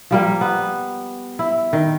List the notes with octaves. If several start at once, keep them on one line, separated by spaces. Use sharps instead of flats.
F3 G3 A#3
B3
E4
D#3